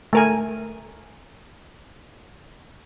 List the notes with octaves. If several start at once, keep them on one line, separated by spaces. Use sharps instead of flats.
A3 A#4 G#5